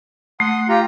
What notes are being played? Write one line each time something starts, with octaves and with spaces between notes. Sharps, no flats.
A3 F#5 C6 D#6
F4 G4 A#5